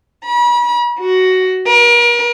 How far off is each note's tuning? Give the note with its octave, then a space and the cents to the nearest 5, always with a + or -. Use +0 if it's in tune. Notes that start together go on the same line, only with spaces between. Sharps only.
B5 -40
F#4 +10
A#4 +40